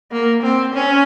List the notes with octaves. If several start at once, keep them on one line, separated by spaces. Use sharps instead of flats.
A#3
C4
C#4